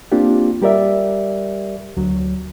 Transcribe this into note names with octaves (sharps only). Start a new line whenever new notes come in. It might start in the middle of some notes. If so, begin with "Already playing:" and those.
A#3 C4 D4 F4 G4
G3 G4 A#4 D5 E5
D2 F#3